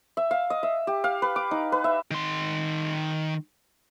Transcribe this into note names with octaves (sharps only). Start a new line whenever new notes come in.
E5
F5
D#5
E5
G4
F5
B4
D6
D#4
B4
E5
D#3 C6